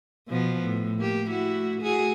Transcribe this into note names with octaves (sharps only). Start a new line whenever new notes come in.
B2 F3 B3
A2
A#3 G4
A3 E4 F#4
A3 F#4 G#4